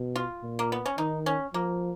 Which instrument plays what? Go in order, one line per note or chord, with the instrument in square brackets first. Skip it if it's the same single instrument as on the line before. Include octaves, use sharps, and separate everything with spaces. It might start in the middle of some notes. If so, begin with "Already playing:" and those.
Already playing: [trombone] B2
[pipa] F4
[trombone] A#2
[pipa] A#3
B3
C#4
[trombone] D#3 [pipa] D#4
[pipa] C#4
[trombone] F3 [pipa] A#3